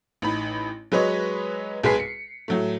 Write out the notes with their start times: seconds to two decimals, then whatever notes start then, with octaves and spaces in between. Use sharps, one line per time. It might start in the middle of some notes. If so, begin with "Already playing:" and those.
0.22 A1 D#4 B5
0.92 F#3 G#3 B4 C#5 D#5
1.83 B1 G#3 G#4 B4 B6 C7
2.00 C#7
2.48 A2 F#3 A3